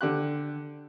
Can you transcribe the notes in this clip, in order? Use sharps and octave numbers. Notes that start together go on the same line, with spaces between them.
D3 G4 F#6